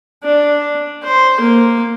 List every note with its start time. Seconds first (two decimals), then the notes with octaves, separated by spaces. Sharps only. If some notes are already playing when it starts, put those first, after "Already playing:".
0.23 D4
1.04 C5
1.40 A#3